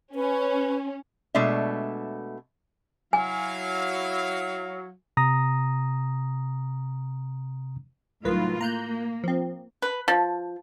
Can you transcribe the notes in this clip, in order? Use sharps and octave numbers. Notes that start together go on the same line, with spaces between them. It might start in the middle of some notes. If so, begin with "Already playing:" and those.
C#4 B4
B2 G#3 A3 D4 E5
F#3 E4 F5 G#5
C3 A#5 D#6 A#6
C2 A2 D#3 F#3 F4 B4
A#3 A#5 F#6 G6
F3 C4
B4
F3